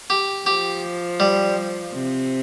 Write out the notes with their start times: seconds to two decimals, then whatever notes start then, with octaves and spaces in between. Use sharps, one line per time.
0.10 G4
0.46 F3 G4
1.20 G3
1.93 C3